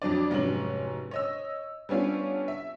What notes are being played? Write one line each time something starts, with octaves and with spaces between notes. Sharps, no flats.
F2 F#3 D4 D5
F1 G#2 F#3 C#4 F#7
C#5 D#5 E6
G3 B3 C#4 D4 F4
E5